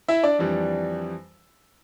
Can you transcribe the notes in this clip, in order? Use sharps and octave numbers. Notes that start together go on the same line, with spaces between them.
E4 E5
D4 D5
F2 E3 G3 D4